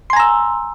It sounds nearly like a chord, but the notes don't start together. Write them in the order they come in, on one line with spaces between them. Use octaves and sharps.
C6 G#5 A#5 E6